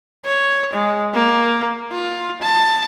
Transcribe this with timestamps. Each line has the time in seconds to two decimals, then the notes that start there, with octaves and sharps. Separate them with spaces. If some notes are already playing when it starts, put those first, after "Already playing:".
0.25 C#5
0.73 G#3
1.14 A#3
1.92 F4
2.42 A5